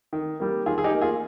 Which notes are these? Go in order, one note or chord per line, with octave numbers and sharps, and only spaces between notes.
D#3
G3 A#3
D#3 F4 G#4
G#4
D#4 G4
A#3
F4 G#4